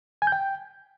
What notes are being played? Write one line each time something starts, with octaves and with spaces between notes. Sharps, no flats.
G#5
G6
G5